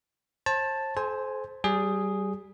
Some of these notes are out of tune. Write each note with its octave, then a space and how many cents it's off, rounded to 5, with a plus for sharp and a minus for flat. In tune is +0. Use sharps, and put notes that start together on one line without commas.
C5 +40 A5 +0
A4 -40 C5 +0 G#5 +0
G3 -25 G#4 +0